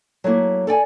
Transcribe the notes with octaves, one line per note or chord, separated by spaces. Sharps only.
F#3 A3 A#3 E4
A4 D5 G5 G#5